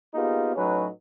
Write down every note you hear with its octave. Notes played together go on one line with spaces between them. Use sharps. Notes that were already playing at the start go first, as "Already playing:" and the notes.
A#3 B3 D#4 F4 G4 G#4
A2 F#3 C#4 D#4 F#4 B4